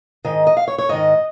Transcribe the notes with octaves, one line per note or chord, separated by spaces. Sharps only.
G#2 D#3 D#5
D#5
F5
C#5
C#5
G#2 D#3 D#5